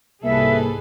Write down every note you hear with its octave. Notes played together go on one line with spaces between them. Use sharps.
C2 G#2 A#3 G#4 A4 B4 E5